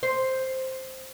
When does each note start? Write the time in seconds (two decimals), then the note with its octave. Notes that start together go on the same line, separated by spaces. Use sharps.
0.03 C5